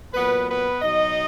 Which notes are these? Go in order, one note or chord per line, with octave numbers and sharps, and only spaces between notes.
A#2 F#3 B3 B4
B3 B4
B2 F#3 D#4 D#5